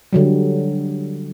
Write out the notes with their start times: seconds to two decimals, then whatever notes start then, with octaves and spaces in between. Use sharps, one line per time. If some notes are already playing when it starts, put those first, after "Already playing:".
0.13 D3 F#3 G3